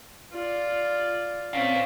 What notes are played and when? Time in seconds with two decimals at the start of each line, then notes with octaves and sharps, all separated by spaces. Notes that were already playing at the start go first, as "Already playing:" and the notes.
0.33 F4 D5
1.54 C4 C#4 D5 F5